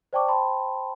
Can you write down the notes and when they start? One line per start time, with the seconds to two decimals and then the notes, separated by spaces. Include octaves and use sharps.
0.13 C5 D5 G5 A5 C#6 D6
0.28 C5 G5 A5 B5 C6